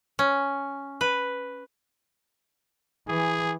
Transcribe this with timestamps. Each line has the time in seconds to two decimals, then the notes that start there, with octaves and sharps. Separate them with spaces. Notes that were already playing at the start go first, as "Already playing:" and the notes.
0.19 C#4
1.01 B4
3.08 E3 G#4